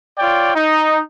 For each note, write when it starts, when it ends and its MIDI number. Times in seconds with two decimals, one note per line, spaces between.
0.18 0.53 65
0.18 0.53 73
0.18 0.53 74
0.18 0.53 79
0.55 1.00 63